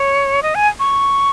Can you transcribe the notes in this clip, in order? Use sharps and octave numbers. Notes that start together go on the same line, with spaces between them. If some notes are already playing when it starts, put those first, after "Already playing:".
Already playing: C#5
D#5
G#5
C#6